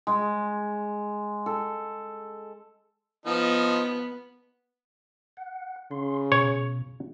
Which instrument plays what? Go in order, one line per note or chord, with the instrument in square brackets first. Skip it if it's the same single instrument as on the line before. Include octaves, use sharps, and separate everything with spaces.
[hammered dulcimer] G#3
A4
[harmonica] F3 D#4 [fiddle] B3
[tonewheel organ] F#5
[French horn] C#3 [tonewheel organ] C6
[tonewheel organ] B2 [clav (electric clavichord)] C#5